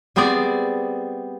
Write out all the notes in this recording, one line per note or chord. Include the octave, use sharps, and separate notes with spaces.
G3 B3 C4 G#4 D5